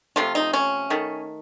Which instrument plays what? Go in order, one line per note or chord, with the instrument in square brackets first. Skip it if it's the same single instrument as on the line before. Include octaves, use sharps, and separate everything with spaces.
[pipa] C3 F3 A3 F4
D#4
C#4
D#3 A3